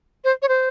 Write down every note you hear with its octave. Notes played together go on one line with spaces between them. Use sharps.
C5
C#5
C5